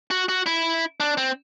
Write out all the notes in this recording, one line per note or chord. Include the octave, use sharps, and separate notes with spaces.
F#4
F#4
E4
D4
C4